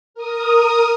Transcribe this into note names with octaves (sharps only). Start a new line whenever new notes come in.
A#4 D#6